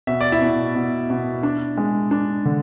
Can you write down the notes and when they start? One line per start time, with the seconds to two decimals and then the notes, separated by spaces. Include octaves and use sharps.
0.07 B2 E5
0.20 D5
0.32 E4 E5
0.41 B2
0.75 B2
1.10 B2
1.43 D4
1.77 G#3
2.11 D4
2.45 D3